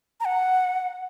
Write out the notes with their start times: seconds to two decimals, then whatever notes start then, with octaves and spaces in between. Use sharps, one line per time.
0.20 A#5
0.25 F#5